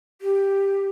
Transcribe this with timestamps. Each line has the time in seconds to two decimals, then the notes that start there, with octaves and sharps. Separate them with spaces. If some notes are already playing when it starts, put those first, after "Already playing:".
0.21 G4